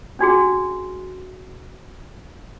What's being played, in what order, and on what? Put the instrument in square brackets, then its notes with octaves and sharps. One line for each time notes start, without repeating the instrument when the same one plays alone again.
[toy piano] C#4 D4 F#4 G#4